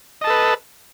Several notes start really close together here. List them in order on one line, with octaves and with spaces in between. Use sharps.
D#5 A5 A4 B4